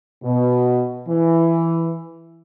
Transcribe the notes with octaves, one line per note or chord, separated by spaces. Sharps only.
B2
E3